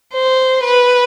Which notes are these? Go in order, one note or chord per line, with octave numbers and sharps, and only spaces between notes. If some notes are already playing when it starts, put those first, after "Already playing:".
C5
B4